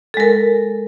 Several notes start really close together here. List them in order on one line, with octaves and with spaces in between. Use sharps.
A4 G#3 A#4